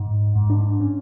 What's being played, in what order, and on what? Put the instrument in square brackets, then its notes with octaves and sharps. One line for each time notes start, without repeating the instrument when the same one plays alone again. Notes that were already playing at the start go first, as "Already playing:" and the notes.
Already playing: [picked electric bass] G#2
G#2
D4
C#4